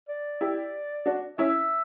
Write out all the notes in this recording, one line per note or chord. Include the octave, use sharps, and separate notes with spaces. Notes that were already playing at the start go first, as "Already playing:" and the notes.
D5
E4 G4
D4 F#4
C#4 E4 E5